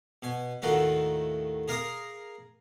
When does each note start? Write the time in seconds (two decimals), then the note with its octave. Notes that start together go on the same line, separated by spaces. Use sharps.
0.22 B2 G#5
0.62 D#2 A2 D#3 A3 F4 F#4
1.68 G#4 A#4 F5 A#5 D6 D#6